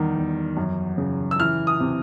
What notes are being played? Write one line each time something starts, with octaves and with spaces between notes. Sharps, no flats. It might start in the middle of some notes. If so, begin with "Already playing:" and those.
Already playing: E2 D#3 G3
E2
F#2
C#3
E6
E3 F6
D#6
C3